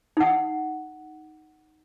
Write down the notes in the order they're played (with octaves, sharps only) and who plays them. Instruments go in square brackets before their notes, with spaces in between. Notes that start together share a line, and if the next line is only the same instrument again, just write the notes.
[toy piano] D#4 F#5